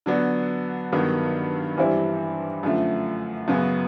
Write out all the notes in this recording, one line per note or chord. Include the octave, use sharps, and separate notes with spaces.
D3 F#3 B3 D4
G2 D#3 F#3 B3
G2 E3 G3 C4 E4
F#2 D3 F3 A3
F#2 C#3 F#3 B3